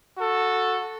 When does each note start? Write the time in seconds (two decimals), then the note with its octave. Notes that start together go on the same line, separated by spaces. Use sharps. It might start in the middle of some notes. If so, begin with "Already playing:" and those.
0.17 F#4 A4